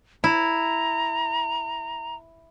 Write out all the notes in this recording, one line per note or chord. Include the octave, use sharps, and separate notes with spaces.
E4 A#5